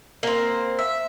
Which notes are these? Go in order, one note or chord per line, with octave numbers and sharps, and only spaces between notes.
A#3 C4
E5